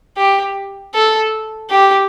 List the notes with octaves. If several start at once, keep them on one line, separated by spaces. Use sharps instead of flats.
G4
A4
G4